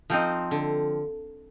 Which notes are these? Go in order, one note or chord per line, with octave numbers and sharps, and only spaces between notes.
F3 C4 D#4
D3